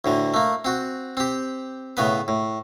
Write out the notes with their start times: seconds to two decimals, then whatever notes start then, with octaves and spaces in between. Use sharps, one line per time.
0.05 D2 A2 D3
0.34 A3 A#3
0.65 C4 F#4
1.17 C4 G4
1.97 A2 C#3 B3 B4
2.28 A2